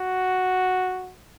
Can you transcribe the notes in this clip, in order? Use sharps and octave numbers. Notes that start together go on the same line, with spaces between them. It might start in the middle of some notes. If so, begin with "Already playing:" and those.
Already playing: F#4